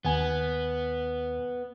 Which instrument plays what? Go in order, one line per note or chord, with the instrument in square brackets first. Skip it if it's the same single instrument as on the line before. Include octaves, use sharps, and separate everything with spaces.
[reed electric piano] D#2 G#5 [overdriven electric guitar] B3